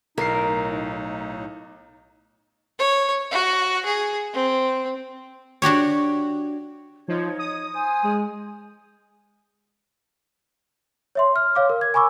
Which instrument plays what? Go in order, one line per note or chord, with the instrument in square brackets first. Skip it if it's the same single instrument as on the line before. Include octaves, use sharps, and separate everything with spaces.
[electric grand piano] B1 C7 [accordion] A2 D#4 [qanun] A#4
[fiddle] C#5
F#4
G#4
C4
[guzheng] D4 F#4 G4 C#5
[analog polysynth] F3 [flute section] D#4 C#5 G#6
[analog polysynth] D#6
[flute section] C5 G#5
[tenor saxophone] G#3
[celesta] C#5 E5 C6
F6
C#5 F5 D6
A#4
G#6
G#5 B5 C#6 D6 E6